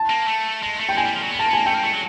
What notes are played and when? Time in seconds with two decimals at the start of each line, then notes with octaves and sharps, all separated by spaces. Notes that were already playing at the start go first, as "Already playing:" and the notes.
Already playing: A5
0.10 A#3
0.27 A3
0.63 G#3
0.80 A3
0.89 G5
0.97 G#3 G#5
1.06 G3
1.14 F3
1.23 F#3
1.31 B3
1.39 A#3 A5
1.49 B3
1.53 A#3 G#5
1.66 A3 G5
1.75 A#3
1.84 A3
1.93 F#3